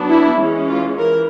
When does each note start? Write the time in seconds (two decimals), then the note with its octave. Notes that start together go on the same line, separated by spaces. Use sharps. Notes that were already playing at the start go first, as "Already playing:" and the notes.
Already playing: F#3 B3 D4
0.09 E4
0.39 E3 G#3 C#4
0.69 F4
0.98 E3 A#4